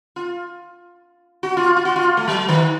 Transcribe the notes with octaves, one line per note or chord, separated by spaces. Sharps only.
F4
F#4
F4
F4
F#4
F4
A3
F#3
D#3